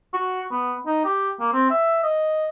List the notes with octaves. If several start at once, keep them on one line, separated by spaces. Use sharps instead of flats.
F#4
B3
D#4
G4
A#3
C4
E5
D#5